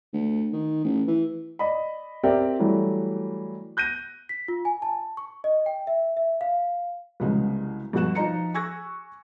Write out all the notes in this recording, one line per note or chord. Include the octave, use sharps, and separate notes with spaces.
D2
D#3
A1
E3
D5 D#5 B5
C4 G4 A#4 D5 E5 G5
E3 F#3 G3 A3
F#6 G6 A#6 D#7
B6
F4
G#5
A5
C#6
D#5
G5
E5
E5
F5
C2 C#3 F#3 G#3 B3
G2 B2 F#4 F#6 E7
F3 D#4 D#5 A#5 C#7
G#5 C#6 E6 F#6 G#6 A#6